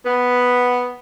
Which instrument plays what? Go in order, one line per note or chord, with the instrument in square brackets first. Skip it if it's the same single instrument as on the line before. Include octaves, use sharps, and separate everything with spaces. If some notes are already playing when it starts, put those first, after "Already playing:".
[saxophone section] B3